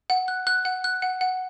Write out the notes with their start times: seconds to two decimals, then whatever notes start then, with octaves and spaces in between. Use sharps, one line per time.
0.10 F#5
0.28 F#6
0.47 F#6
0.65 F#5
0.84 F#6
1.02 F#5
1.21 F#5